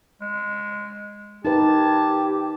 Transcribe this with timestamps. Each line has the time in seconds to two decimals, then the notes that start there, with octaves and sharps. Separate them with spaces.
0.21 G#3
1.45 D#4 G4 A#4 B4 A5